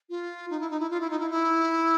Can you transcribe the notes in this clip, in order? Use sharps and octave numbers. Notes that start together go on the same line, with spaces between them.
F4
D#4
E4
D#4
E4
F4
E4
D#4
E4
E4